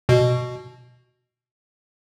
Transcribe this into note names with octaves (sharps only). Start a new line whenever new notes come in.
B2